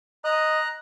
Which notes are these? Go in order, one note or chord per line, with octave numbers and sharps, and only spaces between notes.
D#5 A#5 F#6